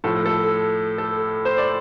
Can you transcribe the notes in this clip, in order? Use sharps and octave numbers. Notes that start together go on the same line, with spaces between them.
A2 F3 A4
A4
A4
C5
D5